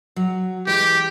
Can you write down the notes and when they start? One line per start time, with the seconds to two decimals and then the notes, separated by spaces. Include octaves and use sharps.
0.16 F#3
0.67 E3 G#3 G4